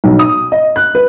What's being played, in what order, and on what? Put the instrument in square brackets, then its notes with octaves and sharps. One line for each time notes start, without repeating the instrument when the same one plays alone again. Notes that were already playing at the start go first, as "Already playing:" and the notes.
[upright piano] B1
D#6
D#5
F#6
B4